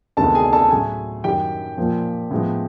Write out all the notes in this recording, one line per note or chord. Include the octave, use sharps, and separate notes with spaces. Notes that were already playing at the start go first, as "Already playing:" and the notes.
D2 C3 D#3 G#3 B3 A4 A5
G#4 G#5
A4 A5
A2 F#3 A3 G#4 G#5
F#2 D#3 F#3 G4 G5
A#2 F3 A#3
A2 F3 G#3 B3